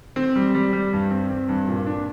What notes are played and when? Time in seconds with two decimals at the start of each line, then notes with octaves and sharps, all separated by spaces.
0.16 C4
0.35 G3
0.55 G3
0.73 G3
0.93 G2
1.11 C4
1.30 C4
1.49 G2
1.68 A#2
1.87 D4